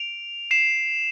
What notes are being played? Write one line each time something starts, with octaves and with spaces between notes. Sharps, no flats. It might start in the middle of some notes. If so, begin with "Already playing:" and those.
Already playing: D7 F7
C7 E7